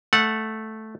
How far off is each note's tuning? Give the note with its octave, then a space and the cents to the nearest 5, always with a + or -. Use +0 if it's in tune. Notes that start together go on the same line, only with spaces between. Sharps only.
A3 -5 F#5 -15